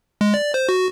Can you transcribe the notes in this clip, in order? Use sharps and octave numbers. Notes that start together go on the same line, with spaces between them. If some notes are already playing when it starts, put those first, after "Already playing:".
G#3
D5
C5
F#4